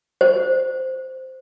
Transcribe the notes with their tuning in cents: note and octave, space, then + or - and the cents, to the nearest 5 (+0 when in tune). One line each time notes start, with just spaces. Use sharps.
C5 -5